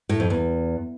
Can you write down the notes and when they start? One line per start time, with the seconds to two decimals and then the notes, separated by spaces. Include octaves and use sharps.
0.09 A2
0.20 F2
0.30 E2